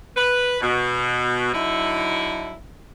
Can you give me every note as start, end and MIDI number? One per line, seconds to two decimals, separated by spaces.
0.17 0.59 71
0.61 1.51 47
1.54 2.53 50
1.54 2.53 54
1.54 2.53 63
1.54 2.53 64